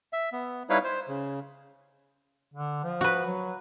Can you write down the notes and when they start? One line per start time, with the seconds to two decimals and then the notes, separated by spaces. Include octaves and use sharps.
0.13 E5
0.32 B3
0.70 G3 D#4 E4 B4 C#5 F5
0.84 C5
1.08 C#3
2.54 D3
2.84 F3
3.01 F#4 B4
3.26 F#3